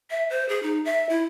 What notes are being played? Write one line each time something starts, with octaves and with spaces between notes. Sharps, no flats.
E5
C5
G#4
D#4
E5
E4